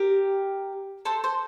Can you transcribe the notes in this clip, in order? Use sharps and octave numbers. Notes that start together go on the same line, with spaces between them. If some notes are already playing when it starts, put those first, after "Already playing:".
Already playing: G4 A#4
A4 C5
C5